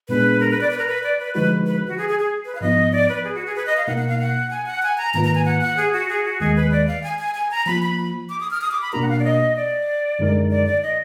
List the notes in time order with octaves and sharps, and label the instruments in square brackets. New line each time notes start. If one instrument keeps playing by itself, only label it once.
[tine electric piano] A#2 G#3 B3 D4 G#4 [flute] B4
[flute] A#4
B4
D5
B4
A#4
B4
D5
B4
[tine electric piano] D3 F3 G#3 D#4 F#4 [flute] B4
[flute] B4
F#4
G#4
G#4
G#4
B4
F5
[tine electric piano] G#2 F3 B3 D#4 [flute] D#5
[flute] D5
B4
G#4
F#4
G#4
B4
D#5
F5
[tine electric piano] B2 A#3 D#4 A#4 [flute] F#5
[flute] F#5
F5
F#5
G#5
F#5
G#5
A#5
[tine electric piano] G#2 D#3 A#3 F4 B4 [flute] A#5
[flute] A#5
G#5
F#5
F#5
G#4
F#4
G#4
F#4
[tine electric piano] D#2 D#3 G#3 [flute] G#4
[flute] B4
D5
F5
G#5
G#5
G#5
A#5
[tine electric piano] F3 A#3 F4 [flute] B5
[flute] B5
D6
D#6
F6
D#6
D6
B5
[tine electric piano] B2 A#3 D4 F#4 A#4 [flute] A#5
[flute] F#5
F5
D5
D#5
D5
[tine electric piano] F#2 D3 G#3 D#4 A#4
[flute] D5
D5
D#5